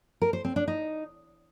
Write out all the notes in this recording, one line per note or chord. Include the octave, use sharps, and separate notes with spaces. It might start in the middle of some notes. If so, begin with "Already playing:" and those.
A#4
C5
C4
D4
D#4